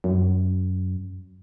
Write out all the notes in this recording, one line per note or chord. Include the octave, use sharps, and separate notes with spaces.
F#2